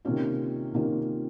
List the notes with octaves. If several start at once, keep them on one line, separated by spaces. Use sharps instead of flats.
C3 D#3 A#3 C#4 F4
C3 D#3 A#3 C#4 F4